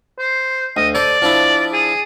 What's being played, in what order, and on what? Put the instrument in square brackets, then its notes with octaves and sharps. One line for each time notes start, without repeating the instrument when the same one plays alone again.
[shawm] C5
[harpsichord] D2 [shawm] D#5
[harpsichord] A4 C5 [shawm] D5
[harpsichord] F3 D4 E4
[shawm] G#4